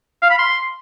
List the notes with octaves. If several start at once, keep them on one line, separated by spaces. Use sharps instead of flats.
F5
B5
C6